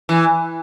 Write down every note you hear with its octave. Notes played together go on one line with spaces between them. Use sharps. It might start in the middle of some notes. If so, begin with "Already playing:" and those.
E3